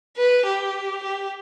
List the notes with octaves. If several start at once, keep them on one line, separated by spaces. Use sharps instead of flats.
B4
G4
G4